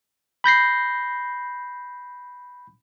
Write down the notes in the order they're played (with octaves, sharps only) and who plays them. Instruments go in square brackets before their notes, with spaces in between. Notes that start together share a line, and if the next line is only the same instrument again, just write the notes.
[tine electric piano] B5 G6 A#6 C7